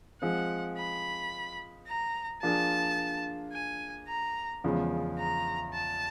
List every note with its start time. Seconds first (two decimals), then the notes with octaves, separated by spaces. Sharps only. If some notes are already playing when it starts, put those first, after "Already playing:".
0.22 F3 G#3 C4 F#5
0.78 B5
1.87 A#5
2.42 F3 A#3 D4 F4 G#4 A5
3.53 G#5
4.08 A#5
4.64 E2 C#3 F3 G#3 B3
5.19 A#5
5.74 A5